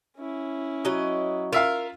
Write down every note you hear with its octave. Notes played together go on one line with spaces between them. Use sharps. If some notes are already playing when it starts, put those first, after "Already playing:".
C#4 E4
F#3 D#5
F4 A#4 E5 F5